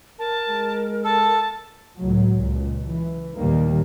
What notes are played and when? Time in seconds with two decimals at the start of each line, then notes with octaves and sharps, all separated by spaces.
0.19 A#4 A5
0.49 G#3
1.04 A4 A5
1.97 C#2 A2 F#3
2.34 C#2 A#2
2.89 E3
3.35 D#2 A#2 D#3 G3 A#3